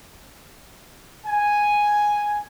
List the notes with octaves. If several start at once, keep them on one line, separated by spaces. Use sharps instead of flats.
G#5